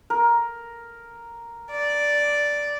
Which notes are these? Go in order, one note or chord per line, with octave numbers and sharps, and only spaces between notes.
A#4
D5